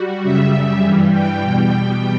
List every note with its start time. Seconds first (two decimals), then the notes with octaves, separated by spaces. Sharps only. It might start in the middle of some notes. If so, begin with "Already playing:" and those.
Already playing: G3 F#4
0.23 F#2 C#3 G3 E5
0.82 G2 E3 G3
1.11 G5
1.40 E2 B2 G3